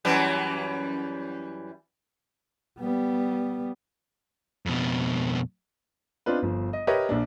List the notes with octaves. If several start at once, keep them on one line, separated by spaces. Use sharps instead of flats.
F#2 E3 G3
G3 B3
F2 B2
B3 C4 D4 D#4 F4 B4
G1 F3
D#5
G4 A#4 B4 C#5 D#5 E5
A#1 D4